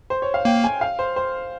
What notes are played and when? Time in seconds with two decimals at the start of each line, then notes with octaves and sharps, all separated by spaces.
0.10 C5
0.22 C#5
0.34 F5
0.45 A#3 G5
0.64 G#5
0.81 F5
0.99 C5
1.16 C5